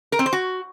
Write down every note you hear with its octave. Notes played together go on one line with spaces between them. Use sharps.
A#4
C4
C5
F#4